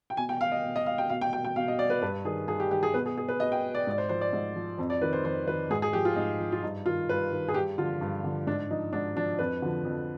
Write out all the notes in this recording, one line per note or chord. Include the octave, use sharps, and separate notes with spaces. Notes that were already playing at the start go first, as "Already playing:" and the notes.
G5
B2 G#5
G5
F5
D#5
B2
D#5
F5
G5
B2 F5
G5
G5
G5
B2 F5
D#5
D5
B4
G2 B4
D#3 G#4
G2 G#4
G4
D#3 G4
G#4
B2 B4
G#4
G#4
B4
B2 D#5
G5
D5
G#2 D5
C5
F3 C5
D5
G#2
F3
F2
D5
D#3 B4
C5
F2 C5
D#3 B4
G#2 G#4
G#4
F3 G4
F4
G#2 D#4
F3
F4
G2 D#4
D#3 F4
G2 B4
D#3
G#4
G2 G4
D3 F3 F4
G2
D3 F3
G#2 D4
F3 D#4
G#2 D4
F3 D4
F2 B4
D3 F3
F2